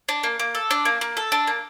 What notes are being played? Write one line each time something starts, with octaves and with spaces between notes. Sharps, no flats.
D4
A#3
A#3
A4
D4
A#3
A#3
A4
D4
A#3